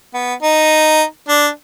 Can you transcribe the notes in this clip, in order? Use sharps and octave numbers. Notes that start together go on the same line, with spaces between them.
B3
D#4
D4